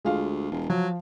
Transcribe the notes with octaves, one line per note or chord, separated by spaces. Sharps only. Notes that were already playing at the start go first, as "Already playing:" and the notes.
D2 G#3 F4 F5
E1
F3 F#3